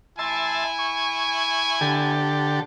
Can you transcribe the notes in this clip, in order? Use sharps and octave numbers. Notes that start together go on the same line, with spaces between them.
E4 E5 G#5 A5 C6
C#6
D3 G4 A4